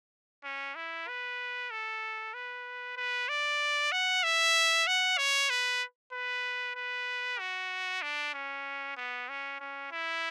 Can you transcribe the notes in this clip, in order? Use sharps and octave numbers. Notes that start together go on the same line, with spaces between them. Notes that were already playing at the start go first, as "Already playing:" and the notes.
C#4
E4
B4
A4
B4
B4
D5
F#5
E5
F#5
C#5
B4
B4
B4
F#4
D4
C#4
B3
C#4
C#4
E4